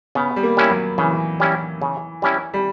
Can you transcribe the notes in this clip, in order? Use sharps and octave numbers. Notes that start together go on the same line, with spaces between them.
C#3 B3
G3
A#3
G3 C#4 E4
F#3
C#3 E3
G3 C#4 E4
C#3
G3 C#4 E4
G3